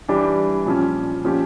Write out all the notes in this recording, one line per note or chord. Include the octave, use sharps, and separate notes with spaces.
E3 G3 D4 G4
A#2 F3 C#4
A#2 F3 C#4 G4